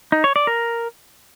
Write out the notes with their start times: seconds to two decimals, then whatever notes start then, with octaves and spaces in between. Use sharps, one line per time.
0.12 D#4
0.24 C#5
0.36 D5
0.47 A#4